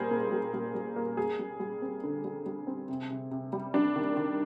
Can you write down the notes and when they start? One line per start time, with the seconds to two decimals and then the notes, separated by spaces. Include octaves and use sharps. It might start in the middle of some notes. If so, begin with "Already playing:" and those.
Already playing: A#2 G3 A#3 G#4 A#4 C5
0.11 A#2
0.32 G3
0.54 G3
0.75 G3
0.96 A#3
1.17 G3 G#4
1.39 G3
1.60 G3
1.82 C4
2.03 D3
2.24 G3
2.46 G3
2.67 C4
2.89 C3
3.10 C3
3.31 C3
3.53 G3
3.74 G3 D4
3.96 D#3
4.17 D#3